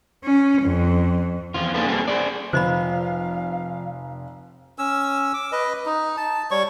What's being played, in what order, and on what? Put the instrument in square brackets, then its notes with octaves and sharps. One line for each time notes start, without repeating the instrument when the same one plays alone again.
[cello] C#4
F2
[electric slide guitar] E2 F3 F4
A#3 D4 D#4 G#4 A4 B4
G3 A#3 C4 F4 G#4 A4
G#4 C5 D5
[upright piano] F1 [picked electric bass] F3 [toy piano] C5 D#5 B5 [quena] F5
[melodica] C#4 E6
D6
B4 D#5
D#4
A5
G3 C#5 C#6